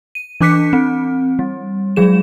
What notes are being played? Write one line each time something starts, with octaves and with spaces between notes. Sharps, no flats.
D#7
E3 D4 D6 F#6 B6 C#7
C4
G3
F#3 G#3 G#4 E7